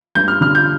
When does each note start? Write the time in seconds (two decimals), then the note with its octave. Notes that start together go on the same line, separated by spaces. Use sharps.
0.15 G2 G6
0.28 F6
0.41 D3 F6
0.55 G6